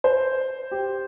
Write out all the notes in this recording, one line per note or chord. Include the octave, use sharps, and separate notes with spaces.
C5
G4